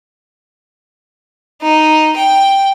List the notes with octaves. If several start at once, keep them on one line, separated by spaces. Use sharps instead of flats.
D#4
G5